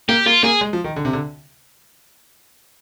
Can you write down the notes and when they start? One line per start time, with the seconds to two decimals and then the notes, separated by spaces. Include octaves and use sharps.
0.09 A#3 G4
0.26 A#3 F4
0.43 A#3 G#4
0.61 G#3
0.73 F3
0.84 D#3
0.96 D3
1.05 C3
1.13 D3